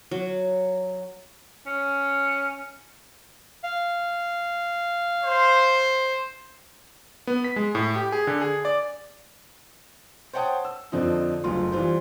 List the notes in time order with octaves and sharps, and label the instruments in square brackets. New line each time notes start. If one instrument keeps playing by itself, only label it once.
[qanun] F#3
[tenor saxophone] C#4
[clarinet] F5
[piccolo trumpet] C5
[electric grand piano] B3
B6
G#3
A2
G4
G#4
D3
G#4
D5
[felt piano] C5 C#5 F#5 G5 A5 D#6
E6
F2 D3 F3 C4 D#4
F#1 D2 F4 C6
E3 G3 F4 C5